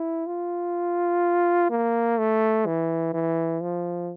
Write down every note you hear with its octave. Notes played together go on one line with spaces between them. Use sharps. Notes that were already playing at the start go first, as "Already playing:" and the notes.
Already playing: E4
F4
A#3
A3
E3
E3
F3